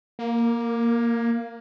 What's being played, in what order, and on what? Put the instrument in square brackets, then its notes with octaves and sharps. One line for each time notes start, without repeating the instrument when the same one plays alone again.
[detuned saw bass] A#3